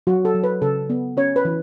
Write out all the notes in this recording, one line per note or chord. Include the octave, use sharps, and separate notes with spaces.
F#3 F#4
A4
F#3
B4
C#3 A4
B3
C#4 C#5
B4
E3